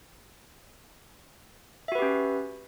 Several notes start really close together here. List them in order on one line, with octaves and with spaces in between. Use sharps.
E5 F#4 B4 G4 C#4